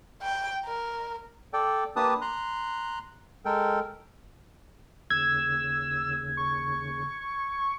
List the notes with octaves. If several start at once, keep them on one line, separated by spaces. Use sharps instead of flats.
G5
A#4
A4 D5 G5
A#3 D4 G4 B4 A5 D#6
A#5 C6 F#6
G#3 A4 A#4 G5
D#2 C#3 E6 G#6
C#6